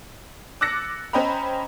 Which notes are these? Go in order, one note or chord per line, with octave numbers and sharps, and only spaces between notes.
D6 E6 F#6 A6 A#6 C#7
C#4 C5 D#5 G5 A#5 B5